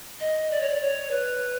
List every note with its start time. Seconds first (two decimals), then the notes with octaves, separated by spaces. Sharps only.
0.20 D#5
0.51 D5
0.61 C#5
0.69 D5
0.81 C#5
1.11 B4